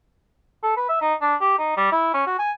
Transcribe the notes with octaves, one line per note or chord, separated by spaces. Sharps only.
A4
B4
E5
D#4
D4
G4
D#4
G3
E4
C#4
F#4
G#5